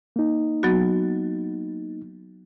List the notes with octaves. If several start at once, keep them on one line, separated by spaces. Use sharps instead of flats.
A#3 D#4
F#3 B3 F#4